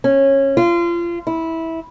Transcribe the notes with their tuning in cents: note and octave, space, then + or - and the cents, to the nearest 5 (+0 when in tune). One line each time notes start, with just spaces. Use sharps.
C#4 -20
F4 -30
E4 -15